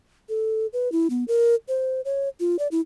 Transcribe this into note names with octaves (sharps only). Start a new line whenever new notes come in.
A4
B4
E4
B3
A#4
C5
C#5
F4
D5
E4